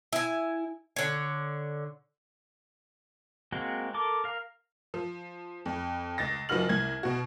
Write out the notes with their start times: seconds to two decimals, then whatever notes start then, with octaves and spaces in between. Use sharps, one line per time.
0.13 E4 G#5
0.96 D3 C#5
3.52 G#3 A#3 C4 F#4
3.94 A4 A#4 D6
4.24 A#4 F5
4.94 F3
5.66 F2
6.18 C#2 A6 A#6
6.49 F#1 F3 F#4 B4 F6 F#7
6.69 C2 G#6
7.03 B2 F#4